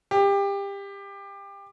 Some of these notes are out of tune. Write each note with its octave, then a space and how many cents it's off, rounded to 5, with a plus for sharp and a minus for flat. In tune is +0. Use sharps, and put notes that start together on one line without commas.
G4 +25